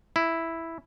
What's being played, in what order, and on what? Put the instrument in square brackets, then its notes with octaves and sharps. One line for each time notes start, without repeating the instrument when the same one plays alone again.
[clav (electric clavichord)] E4